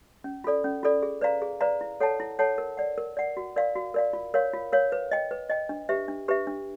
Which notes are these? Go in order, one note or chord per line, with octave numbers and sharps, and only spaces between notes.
C#4
F4 A4 D5
C#4
F4 A4 D5
G#4
B4 D5 F5 A#5
G#4
B4 D5 F5 A#5
E4
A4 C#5 F#5 A5
E4
A4 C#5 F#5 A5
A#4
D5 F#5
A#4
D5 F#5
F#4
A#4 D5 F5
F#4
A#4 D5 F5
F4
A#4 C#5 F5
F4
A#4 C#5 F5
B4
D#5 G5
B4
D#5 G5
D4
G4 B4 E5
D4
G4 B4 E5
D4